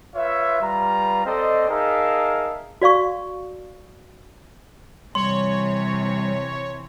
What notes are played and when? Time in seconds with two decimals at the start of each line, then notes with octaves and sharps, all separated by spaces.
0.15 F4 B4 C#5 E5
0.62 G3 F4 B4 A#5
1.26 C4 A4 C5 D5 D#5
1.69 D#4 G#4 A#4 E5 F5 A5
2.82 F#4 D5 F5 C#6
5.15 C3 E3 G3 C#5 C6